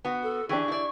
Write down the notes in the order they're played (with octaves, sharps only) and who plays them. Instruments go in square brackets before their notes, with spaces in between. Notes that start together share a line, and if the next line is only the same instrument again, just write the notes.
[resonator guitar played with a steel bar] B3 F#4
[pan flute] A4
[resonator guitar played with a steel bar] E3 [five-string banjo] D4 G4 G#4 [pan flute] C#6
[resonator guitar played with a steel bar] E4 D5